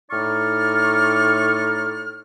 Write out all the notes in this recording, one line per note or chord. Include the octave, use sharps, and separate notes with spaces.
A2 D#4 D5 C#6 F6